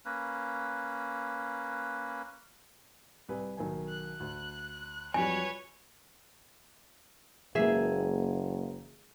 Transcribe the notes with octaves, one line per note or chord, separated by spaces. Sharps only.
A#3 C#4 B4
C2 B4 G#5
B1 D#3 G#5
F#6
D2
F2 F#3 G3 B4 C#5 G#5
F#1 E3 G#3 A#3 G#4 E5